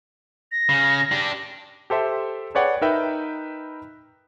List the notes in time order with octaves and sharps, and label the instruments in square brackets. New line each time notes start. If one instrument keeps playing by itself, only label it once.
[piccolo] A#6
[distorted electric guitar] C#3
D4 G4
[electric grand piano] G4 A4 C5 E5
G#4 B4 C#5 D5 F#5 G5
D#4 A#4 B4 E5 G5